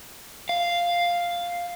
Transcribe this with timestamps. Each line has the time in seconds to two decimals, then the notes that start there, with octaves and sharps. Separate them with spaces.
0.49 F5